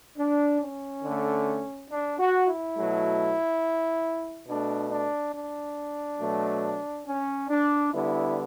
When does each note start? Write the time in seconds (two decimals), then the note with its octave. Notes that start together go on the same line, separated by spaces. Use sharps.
0.18 D4
0.61 C#4
1.04 D3 A3
1.90 D4
2.19 F#4
2.48 E4
2.76 B2 F#3 A3
4.48 B2 A3 D4
4.91 D4
5.34 D4
6.20 B2 F#3 A3
7.06 C#4
7.49 D4
7.92 D3 G3 B3 E4